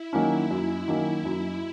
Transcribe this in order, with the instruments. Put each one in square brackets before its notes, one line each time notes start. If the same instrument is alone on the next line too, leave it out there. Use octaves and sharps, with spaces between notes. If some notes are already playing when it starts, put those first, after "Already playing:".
Already playing: [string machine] E4
[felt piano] D#3 F#3 A#3 C#4
[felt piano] F#2 [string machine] E4
[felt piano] D#3 F#3 A#3 C#4
F#2